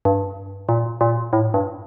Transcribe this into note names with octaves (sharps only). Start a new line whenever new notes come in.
G2
A#2
A#2
A2
G2